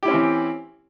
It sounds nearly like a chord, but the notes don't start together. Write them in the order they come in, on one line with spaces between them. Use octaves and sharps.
G4 E4 C#4 C4 E3